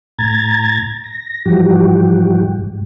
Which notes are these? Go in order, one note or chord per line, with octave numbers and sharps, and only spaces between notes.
A2 A#5 G#6 A6
A#6
G#2 E3 F3 G3 F#4 G4
G#2